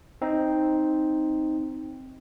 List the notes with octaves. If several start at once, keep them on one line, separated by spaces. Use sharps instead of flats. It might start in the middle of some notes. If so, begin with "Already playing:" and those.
C4 D#4